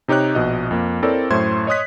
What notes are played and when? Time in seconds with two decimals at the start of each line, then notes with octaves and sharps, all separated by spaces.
0.08 C3 D#4 G4 C#5 F#6
0.35 A#1 B2 D#5
0.71 F2 A#3
1.03 C4 E4 A4 A#4 C#5 D5
1.30 F#2 A2 A3 C5 C6 G#6
1.67 C#5 D#5 C6 D#6 F#6 B6